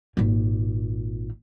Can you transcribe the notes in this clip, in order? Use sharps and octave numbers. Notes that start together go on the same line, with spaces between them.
G#1 A#2